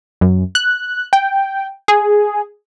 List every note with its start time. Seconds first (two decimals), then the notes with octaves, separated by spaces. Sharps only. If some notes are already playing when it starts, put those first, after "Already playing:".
0.21 F#2
0.55 F#6
1.13 G5
1.88 G#4